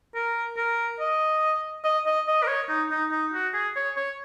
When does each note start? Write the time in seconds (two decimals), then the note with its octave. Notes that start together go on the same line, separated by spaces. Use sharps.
0.15 A#4
0.57 A#4
1.00 D#5
1.84 D#5
2.06 D#5
2.27 D#5
2.43 A#4
2.47 C#5
2.69 D#4
2.91 D#4
3.11 D#4
3.33 F#4
3.54 G#4
3.76 C#5
3.96 C#5